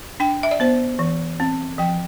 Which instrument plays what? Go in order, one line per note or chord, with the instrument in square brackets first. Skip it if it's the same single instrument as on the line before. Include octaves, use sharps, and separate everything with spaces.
[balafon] D4 G5
E5
D5
B3 C5
E3
C4
F3 G5